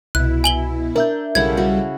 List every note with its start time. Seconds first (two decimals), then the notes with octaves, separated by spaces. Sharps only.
0.15 C2 B2 E4 F#6
0.44 G#5 F#7 G7
0.96 D4 A#4 E5 G6
1.35 B1 C#3 G3 E4 A4 F#5 G#6
1.57 F#4